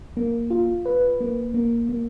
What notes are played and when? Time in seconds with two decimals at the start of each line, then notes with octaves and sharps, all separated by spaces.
0.17 A#3
0.50 F4
0.85 B4
1.21 A#3
1.54 A#3
1.89 A#3